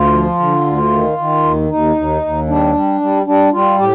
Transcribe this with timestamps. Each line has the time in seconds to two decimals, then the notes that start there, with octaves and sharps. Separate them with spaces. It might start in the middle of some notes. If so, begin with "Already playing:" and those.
Already playing: D2 F4
0.14 F3
0.39 D3
0.66 D2
0.92 D#3
1.18 D#3
1.44 D#2
1.70 D#2 D#4
1.96 D#2
2.22 D#2
2.48 G3 D4
2.75 G3
3.01 G3
3.26 G3 D4
3.52 G3 F4
3.78 A2 G4